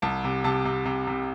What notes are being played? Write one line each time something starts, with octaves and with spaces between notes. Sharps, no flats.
C2 A5
C3
C3 A5
C3
C3
C3